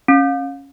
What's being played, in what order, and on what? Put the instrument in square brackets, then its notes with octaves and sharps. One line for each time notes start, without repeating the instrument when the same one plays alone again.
[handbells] C#4